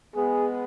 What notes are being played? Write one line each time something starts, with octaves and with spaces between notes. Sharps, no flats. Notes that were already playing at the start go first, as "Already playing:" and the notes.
G#3 B3 G#4